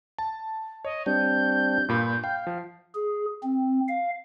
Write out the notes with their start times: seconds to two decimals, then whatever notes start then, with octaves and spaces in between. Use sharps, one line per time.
0.18 A5
0.85 C#5 D#5
1.06 G3 C4 D4 G6
1.88 G2 A#2 B5
2.24 F5 G5
2.47 F3
2.95 G#4
3.43 C4
3.88 F5